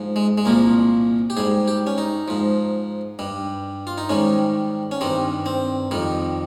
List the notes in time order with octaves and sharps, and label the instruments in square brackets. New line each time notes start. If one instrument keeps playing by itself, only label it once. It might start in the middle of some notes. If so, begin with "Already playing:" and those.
Already playing: [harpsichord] G#2 F3
G#3
G#3
C2 A#2 F3 A#3
G4
G#2 G3 G#4
G4
C#4
D#4
G#2 F3
G2 G3
F4
D#4
G#2 D#3 G3 C#4
C#4
G2 D#3 G3 C4
C4
F2 D#3 G3